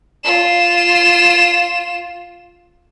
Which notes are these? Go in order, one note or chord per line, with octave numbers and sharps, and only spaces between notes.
F4 E7